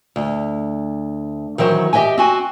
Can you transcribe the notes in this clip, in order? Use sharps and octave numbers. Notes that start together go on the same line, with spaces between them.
D2
D#3 E3 F#3 C5
G4 D#5 E5 G5 G#5
C4 F#4 G#5